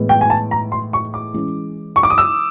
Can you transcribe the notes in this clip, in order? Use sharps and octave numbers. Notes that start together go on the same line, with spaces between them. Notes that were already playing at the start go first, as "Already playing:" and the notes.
Already playing: A2 E3 G#3 B3
G5
G#5
A5
A#5
C6
C#6
D6
E3 G#3 C#4
C#6
D6
D#6
E6